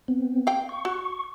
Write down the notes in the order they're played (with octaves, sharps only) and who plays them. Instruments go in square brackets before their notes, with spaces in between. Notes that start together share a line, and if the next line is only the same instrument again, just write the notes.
[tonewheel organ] B3 C4
[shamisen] F5 G5
[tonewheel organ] C#6
[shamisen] F#4